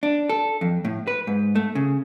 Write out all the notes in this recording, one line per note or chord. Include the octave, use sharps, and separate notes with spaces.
D4
A4
F2
A2
B4
G#2
A3
C#3